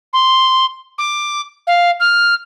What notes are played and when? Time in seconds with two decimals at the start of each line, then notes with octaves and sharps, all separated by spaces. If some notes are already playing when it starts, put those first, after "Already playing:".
0.13 C6
0.98 D6
1.67 F5
2.00 F6